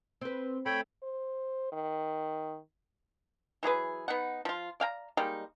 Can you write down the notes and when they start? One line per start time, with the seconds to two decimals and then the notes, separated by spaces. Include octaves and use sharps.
0.21 C4 B4
0.66 A3 C#5 G5 B5
1.03 C5
1.72 D#3
3.63 E3 F#3 G#4 B4
4.08 B3 D#4 F#5
4.45 F3 F4
4.80 D5 F5 G5 A#5
5.17 G3 G#3 A#3 D#4